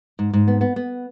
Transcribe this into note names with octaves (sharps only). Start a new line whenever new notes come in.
G#2
G#2
B3
B3
B3